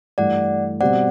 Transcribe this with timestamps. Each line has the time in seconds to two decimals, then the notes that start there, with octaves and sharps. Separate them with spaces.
0.18 G2 E3 A3 D5 F#5
0.80 B2 G3 C4 D5 F#5